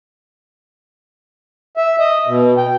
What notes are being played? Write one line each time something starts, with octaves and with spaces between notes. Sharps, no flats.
E5
D#5
B2
G5